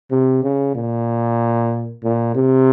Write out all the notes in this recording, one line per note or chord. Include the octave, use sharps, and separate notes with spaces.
C3
C#3
A#2
A#2
C3